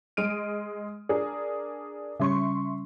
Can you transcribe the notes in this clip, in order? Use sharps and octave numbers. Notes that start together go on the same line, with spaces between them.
G#3 F6 D7 D#7
D4 G#4 A#4
C#3 G3 C#4 E5 C6 C#6